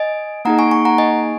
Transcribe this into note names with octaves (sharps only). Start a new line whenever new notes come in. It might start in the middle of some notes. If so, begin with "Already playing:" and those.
Already playing: D#5 G#5
A#3 D#4 G#4 F#5 A#5
G#5 C#6
G#5 C#6
F#5 A#5
D#5 G#5